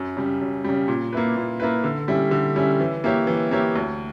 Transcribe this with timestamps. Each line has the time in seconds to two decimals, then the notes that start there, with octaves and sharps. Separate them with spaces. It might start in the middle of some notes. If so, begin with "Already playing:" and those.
Already playing: F#2
0.17 C#3 G3
0.41 F#2
0.64 C#3 G3
0.88 A#2
1.13 A#3 E4 B4
1.36 A#2
1.60 A#3 E4 B4
1.84 D3
2.08 G3 C#4 E4
2.31 D3
2.56 G3 C#4 E4
2.80 E3
3.04 A#3 E4 G4 C#5
3.27 E3
3.51 A#3 E4 G4 C#5
3.76 D2